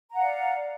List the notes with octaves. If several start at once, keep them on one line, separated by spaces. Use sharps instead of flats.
D5 F5 F#5 A#5